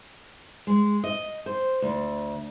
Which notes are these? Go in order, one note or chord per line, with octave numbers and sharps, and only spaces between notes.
G#3
D#5
C5
D2